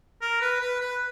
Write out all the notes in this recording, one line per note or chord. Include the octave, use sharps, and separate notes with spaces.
A#4
B4
B4
B4